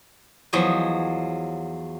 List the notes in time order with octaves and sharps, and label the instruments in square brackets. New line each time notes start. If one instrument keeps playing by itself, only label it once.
[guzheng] E2 F3 F#3 D#5 G#5